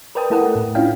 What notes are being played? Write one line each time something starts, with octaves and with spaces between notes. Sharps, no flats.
A#4 B4 D5 G5 A5 D#6
A3 E4 A4 A#4 F#5
A2
C#4 D4 E4 F4 F5 G5